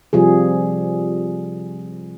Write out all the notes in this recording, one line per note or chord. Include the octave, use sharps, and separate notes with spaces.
C3 F3 G3 G#4